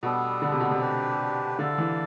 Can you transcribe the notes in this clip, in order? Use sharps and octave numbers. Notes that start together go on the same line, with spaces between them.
B2 G3 B3 D4 A4
D3
C3
B2
C3
D4 G4 B4
D3 E4 A4 D5 F5
E3